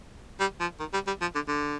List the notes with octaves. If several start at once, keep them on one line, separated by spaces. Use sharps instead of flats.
G3
F3
D#3
G3
G3
F3
D3
D3